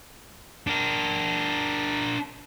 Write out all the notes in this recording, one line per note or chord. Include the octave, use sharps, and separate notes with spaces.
D4 A#4